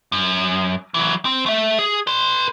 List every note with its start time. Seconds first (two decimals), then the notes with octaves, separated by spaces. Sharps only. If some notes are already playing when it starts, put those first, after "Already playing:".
0.12 F#2
0.94 E3 F#3
1.25 C4
1.46 A3 E5
1.79 G#4
2.07 B4 C6